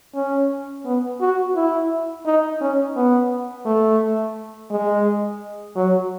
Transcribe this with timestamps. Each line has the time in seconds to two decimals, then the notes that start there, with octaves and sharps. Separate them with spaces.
0.15 C#4
0.85 B3
1.21 F#4
1.55 E4
2.26 D#4
2.61 C#4
2.96 B3
3.66 A3
4.70 G#3
5.76 F#3